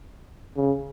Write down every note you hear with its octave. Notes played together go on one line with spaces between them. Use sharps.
C#3